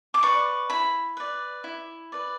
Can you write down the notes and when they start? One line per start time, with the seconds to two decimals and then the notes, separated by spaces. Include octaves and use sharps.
0.14 D6
0.23 B4 D5 C#6
0.70 E4 B5
1.17 B4 D5
1.64 E4
2.12 B4 D5